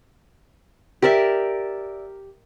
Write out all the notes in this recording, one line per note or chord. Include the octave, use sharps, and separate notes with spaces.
G4 A#4 D5 E5